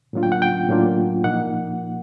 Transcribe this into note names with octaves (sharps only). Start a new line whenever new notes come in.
A2 F#3 A#3 D4 F4
G5
F#5
G5
A2 F#3 A#3 D4 F4
A#2 F3 A#3 D#4 F#5